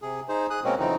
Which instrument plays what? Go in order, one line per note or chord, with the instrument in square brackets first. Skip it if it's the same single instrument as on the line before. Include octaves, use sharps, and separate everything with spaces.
[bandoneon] C3 G#4
D#4 G#4 C5
G#4 D#6 F#6
B2 G#3 A#3 C4 C#4
F2 C#3 E3 F#3 C4 D#4